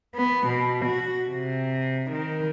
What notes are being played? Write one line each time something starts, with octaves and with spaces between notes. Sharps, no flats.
B3
B2
F#4
C3
D#3